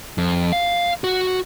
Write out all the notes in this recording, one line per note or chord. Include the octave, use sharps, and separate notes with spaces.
F2
F5
F#4